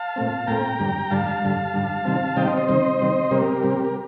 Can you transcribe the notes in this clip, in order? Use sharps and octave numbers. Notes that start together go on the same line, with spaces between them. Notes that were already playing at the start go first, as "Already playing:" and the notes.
Already playing: F5 A5
A#2 A3 C4
A#2 A3 C4 G5 A#5
G2 D3 G3
G2 D3 G3 F5 A5
G2 D3 G3
G2 D3 G3
C3 D#3 G3 C4
C3 D#3 G3 C4 D#5 G5
C5 D#5
C5 D#5
C3 D#3 G3 C4 C5 D#5
C3 D#3 G3 C4
C3 G3 C4 G4 A#4
C3 G3 C4
A#4